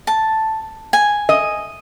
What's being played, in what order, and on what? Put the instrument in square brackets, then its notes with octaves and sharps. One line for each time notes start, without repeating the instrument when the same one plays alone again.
[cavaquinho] A5
G#5
[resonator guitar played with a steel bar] D#5